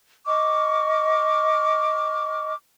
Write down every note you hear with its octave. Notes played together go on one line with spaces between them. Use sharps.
D#5 C#6 D6 F6